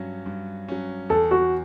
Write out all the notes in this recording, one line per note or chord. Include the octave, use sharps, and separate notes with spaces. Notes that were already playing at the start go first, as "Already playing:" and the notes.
Already playing: G2 F#3 C#4
G2
F#3 C#4
E2 A4
F#4